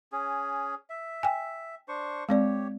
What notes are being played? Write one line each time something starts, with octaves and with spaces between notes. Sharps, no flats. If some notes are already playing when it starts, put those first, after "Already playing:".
C#4 G#4
E5
G5 G#5
D4 C5 C#6
G#3 C4 G4 C#5 D5